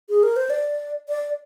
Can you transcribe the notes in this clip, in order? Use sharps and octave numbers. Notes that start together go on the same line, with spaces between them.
G#4
A#4
C5
D5
D5